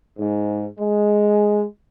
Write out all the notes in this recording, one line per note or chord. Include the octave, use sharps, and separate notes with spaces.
G#2
G#3